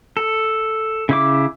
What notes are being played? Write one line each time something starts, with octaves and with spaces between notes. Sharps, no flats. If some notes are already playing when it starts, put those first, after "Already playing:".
A4
C#3 E4 D6